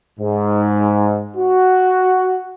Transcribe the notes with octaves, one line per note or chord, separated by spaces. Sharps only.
G#2
F#4